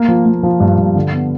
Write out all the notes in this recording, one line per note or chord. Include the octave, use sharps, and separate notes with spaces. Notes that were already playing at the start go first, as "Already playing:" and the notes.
Already playing: A#3
F3
A#3
F3
G2
G2
D3
B3